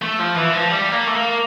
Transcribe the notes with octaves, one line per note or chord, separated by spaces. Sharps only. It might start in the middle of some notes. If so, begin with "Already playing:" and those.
A3
F3
E3
F3
G3
A#3
A3
A#3